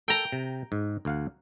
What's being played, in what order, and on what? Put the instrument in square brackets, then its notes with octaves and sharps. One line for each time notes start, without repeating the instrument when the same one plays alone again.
[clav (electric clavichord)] A4 [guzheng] G5 A#5
[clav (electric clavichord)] C3
G#2
D2 F5 F#5